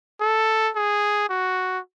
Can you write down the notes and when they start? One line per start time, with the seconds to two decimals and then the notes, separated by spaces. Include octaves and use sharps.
0.21 A4
0.76 G#4
1.29 F#4